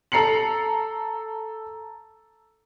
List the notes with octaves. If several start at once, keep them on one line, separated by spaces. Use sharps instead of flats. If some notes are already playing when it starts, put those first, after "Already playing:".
A4 A#5 C7 C#7 F#7